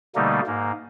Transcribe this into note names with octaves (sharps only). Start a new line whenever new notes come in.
B2 D3 G3 A3 A#3 D#4
G#2 A#3